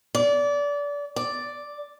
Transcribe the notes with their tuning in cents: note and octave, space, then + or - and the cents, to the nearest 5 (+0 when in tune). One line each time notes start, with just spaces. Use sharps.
D5 -25
D5 +0